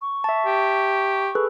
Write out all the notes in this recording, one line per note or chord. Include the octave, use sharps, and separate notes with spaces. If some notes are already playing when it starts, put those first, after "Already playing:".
C#6
E5 A5
G4
G#4 A4 B4